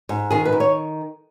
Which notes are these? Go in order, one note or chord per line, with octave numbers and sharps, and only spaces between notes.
G#2
D#3 G#4
B4
D#3
C#5